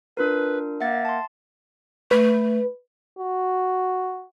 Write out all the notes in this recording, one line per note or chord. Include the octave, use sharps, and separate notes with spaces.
D4 F4 A#4 B4
A#3 E5 F#5 A6
A5 C6
A3 B4
F#4